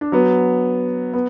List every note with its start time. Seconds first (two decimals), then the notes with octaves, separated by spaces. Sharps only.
0.01 D4
0.12 F#3 B3
1.13 B3